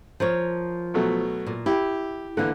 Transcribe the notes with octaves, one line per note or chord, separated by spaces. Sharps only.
F3 A#4 C#5
B2 F#3 A3
A#2
E4 G4
D3 E3 A#3 F#6